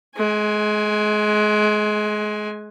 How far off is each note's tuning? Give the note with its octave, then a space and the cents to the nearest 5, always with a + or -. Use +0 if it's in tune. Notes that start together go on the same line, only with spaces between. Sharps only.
G#3 +25 G#5 +0